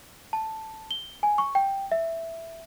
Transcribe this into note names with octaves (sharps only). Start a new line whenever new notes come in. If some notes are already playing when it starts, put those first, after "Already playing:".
A5
G7
G#5
C#6
G5
E5